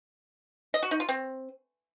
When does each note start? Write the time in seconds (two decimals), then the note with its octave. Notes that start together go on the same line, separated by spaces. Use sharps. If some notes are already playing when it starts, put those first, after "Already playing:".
0.74 D#5
0.83 F#4
0.91 D#4
1.00 F4
1.09 C4